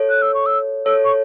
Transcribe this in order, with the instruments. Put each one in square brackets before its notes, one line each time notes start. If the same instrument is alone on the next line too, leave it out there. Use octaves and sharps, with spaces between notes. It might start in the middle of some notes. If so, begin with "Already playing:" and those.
Already playing: [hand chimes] A4 C#5
[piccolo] F#6
E6
C#6
E6
[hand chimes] A4 C#5 [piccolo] E6
[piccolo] C#6